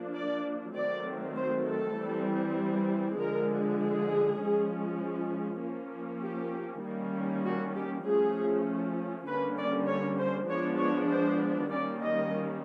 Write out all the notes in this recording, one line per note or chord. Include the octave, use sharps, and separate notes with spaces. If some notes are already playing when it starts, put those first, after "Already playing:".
Already playing: F3 A#3 D4
D5
D#3 F#3 A3 C4 D5
C5
A4
E3 G3 C4
D3 F3 G#3 A#4
G#4
F3 G#3 C#4
F3 A#3 C#4
G4
D#3 G3 A#3 C#4
F#4
G4
F3 A3 C#4 G#4
D3 G3 A#3 C#4 B4
D5
C#5
C5
F3 G#3 B3 D4 C#5
C#5
C5
D#3 G3 A#3 C#4 D5
D#5